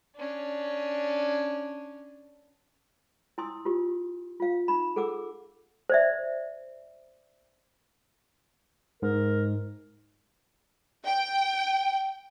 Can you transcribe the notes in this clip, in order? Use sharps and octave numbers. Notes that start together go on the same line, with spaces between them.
C#4 D4
E4 G#5 C6 D#6 E6
F4 G4
F4 F5
D#4 B5
G#4 A4 F#5 D6 E6
C5 D5 E5
G#2 A#4
G5